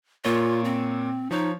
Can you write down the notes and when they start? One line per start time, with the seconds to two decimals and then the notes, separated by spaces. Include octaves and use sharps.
0.25 A#2 A#3 F4 C#5
0.64 C4
1.31 F3 D#4 C#5